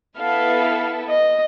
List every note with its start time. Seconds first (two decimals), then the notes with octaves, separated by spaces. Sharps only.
0.18 B3 E4 A4 F5
1.09 D#5